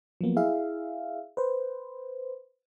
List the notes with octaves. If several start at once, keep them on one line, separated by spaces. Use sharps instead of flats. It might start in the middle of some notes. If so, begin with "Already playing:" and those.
F3 F#3 A#3 B3
E4 G#4 E5 F5
B4 C5